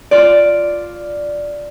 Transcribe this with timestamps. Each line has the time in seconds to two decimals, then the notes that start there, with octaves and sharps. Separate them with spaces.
0.11 F4 D5